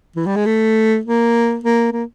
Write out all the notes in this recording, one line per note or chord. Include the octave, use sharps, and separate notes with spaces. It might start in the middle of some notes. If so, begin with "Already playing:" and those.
E3
G3
G#3
A3
A#3
A#3
A#3